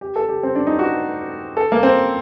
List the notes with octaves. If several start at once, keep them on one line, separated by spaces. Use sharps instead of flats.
G4
A4
G4
C4
D4
D#4
F#4
A4
A#3
C4